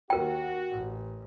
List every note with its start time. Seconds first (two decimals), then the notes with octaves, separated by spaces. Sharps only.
0.10 D#2 F#4 A#4 G5
0.70 A1